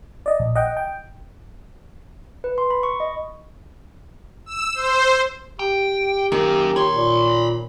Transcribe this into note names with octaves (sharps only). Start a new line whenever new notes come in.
D5 D#5
A#1
D#5 F#5 G5
G5
B4
C6
B5
C#6
D#5
E6
C5
G4 G5
F#2 D#3 A#3
C#5 B5 C6
A#2